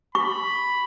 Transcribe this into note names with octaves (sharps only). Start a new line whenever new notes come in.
B5 C#6